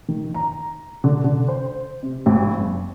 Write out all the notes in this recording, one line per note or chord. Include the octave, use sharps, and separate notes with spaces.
D#3
A#5
D3
D3
C5
C3
G#1
F#1